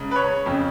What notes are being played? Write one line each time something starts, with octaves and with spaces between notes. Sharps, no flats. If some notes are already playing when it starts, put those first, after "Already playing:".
Already playing: C#2 C#3
B4
C#5
F2 C#3